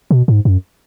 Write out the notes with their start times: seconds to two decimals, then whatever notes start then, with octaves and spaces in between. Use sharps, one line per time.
0.11 B2
0.28 G#2
0.45 F#2